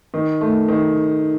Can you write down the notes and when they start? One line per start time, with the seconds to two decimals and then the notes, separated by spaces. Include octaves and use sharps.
0.14 D#3
0.41 A3
0.68 D#3